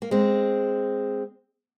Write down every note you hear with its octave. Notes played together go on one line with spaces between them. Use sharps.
A#3
G#3 C4